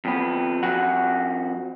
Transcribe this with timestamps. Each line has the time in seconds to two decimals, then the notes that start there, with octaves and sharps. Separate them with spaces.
0.05 F2 B3
0.63 F2 F#4 F#5